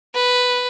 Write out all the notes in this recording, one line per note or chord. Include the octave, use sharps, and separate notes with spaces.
B4